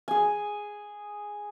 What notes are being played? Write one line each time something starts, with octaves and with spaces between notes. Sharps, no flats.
G#4 G#5